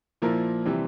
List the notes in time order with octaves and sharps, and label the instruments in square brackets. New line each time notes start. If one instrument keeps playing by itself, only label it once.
[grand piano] A#2 F3 A#3 E4 A#4
C3 E3 G3 C4